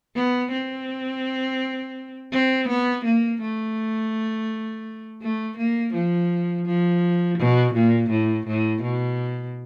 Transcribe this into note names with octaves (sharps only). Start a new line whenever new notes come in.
B3
C4
C4
B3
A#3
A3
A3
A#3
F3
F3
B2
A#2
A2
A2
B2